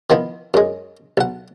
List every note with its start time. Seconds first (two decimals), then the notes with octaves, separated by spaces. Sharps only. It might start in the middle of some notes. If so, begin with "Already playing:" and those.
0.10 D#3 F3 B3 E4
0.54 F#2 G#3
1.17 B1 F#5